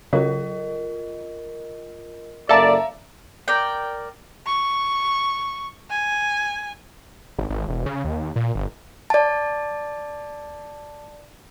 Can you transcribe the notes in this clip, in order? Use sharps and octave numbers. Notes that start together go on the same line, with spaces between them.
C#3 F#3 F4 A#4 D#5
F#1 A#3 A4 D5 E5 F5 A5 A#5
A#4 D5 G5
C#6
G#5
G#1
G#1
E1
C#3
D#2
A#2
G1
D5 A5